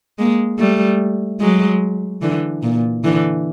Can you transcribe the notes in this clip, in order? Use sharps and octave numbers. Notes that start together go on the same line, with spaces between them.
G#3 A#3
G3 A3
F#3 G#3
D3 E3
A#2
D3 E3